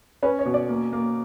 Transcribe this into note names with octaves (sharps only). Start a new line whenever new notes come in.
C#4 B4
C#5
B2
D5
A#3
A#3